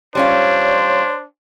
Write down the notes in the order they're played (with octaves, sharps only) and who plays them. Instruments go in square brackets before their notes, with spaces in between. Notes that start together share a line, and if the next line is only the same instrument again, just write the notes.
[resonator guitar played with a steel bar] G3 C#4 F4 [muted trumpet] D4 [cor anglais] C5 [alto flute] C#5